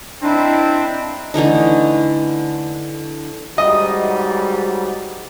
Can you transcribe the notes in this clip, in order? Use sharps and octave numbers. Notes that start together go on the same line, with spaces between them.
C4 D4 E4 D#5 A#5
D3 E3 A3 D#4
G#2 F#3 G3 D#5